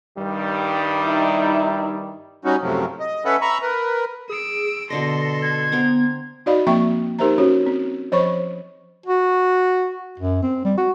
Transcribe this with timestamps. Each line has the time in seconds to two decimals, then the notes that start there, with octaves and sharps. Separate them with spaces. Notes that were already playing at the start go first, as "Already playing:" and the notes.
0.17 G2 D#3 G3
1.05 D#4 E4
2.45 G3 C#4 D#4 F#4
2.62 F#2 A2 C3 F3 F#3
3.00 D#5
3.25 C#4 A4 B4 E5 F#5
3.41 E5 A#5 B5 C#6
3.62 A#4 B4
4.29 G#4 E6 D7
4.90 B2 D3 A4 D#5 C6 A#6
5.43 G#6
5.72 B3 C5 G5 A#5
6.46 D#4 F#4 D5 D#5 F5 B5
6.67 F3 A#3 C4 E5 G5 C#6
7.19 D#4 G4 A#4 C5 E5 A#5
7.38 C#4 F#4 C#5
7.66 C4
8.12 F3 C5 C#5 D#5 B5 C#6
9.06 F#4
10.19 F#2
10.42 C4
10.65 G3
10.77 F#4